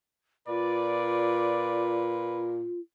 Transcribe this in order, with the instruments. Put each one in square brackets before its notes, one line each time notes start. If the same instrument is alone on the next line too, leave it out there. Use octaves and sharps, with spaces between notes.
[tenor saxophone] A#2 [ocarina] F4 [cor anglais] B4 [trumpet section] D5